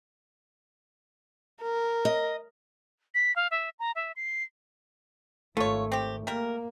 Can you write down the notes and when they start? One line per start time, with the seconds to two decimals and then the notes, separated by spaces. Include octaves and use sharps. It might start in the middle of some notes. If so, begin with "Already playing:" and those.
1.62 A#4
2.05 D#5
3.14 B6
3.36 F5
3.51 E5
3.79 A#5
3.95 E5
4.16 C7
5.57 G#1 A3 F4 C#5
5.92 C4 G4
6.27 G3 A#3 A#4